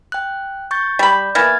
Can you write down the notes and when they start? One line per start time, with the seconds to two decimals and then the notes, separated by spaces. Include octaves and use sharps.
0.12 G5 F#6
0.71 C#6 G6 A6
0.99 G3 D5 B5 G6
1.35 E3 A#3 B3 F6 G#6 A6